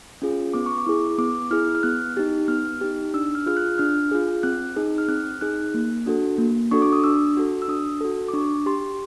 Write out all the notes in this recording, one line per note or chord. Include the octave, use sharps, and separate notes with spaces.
C#4 F4 G#4
B3 D6
C#6
D6
E4 G#4
B3 D6
E4 G#4 F6
F6
B3 F#6
D#4 G4
B3 F6
D#4 G4
D4 E6
F6
F4 G#4 F6
F#6
D4 F6
F4 G#4
C4 F#6
D#4 G#4
F6
C4 F#6
D#4 G#4 F#6
A#3
D4 F#4 A4
A#3
D4 F#4 A4 C#6
D6
D#6
D4 E6
F#4 A4
E6
D4 D#6
F#4 A4
D6
D4 C#6
G4 C6